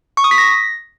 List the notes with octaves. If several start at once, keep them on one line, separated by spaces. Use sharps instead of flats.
C#6
D#6
B6
A#6